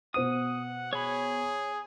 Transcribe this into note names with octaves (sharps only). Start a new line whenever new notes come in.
B2 C5 F#5 D#6 D#7
G#4 C#5 B5